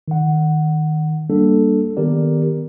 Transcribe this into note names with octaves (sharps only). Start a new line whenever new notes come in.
D#3 F#5
G3 A#3 D4 A4
D#3 B3 G4 A#4 D5